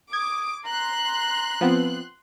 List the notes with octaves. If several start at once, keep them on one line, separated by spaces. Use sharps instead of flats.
D6 D#6 G#6
A#5 C6 F#6
F3 B3 C4